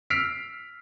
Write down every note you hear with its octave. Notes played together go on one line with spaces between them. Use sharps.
E6 F6 B6 C7 D7 F7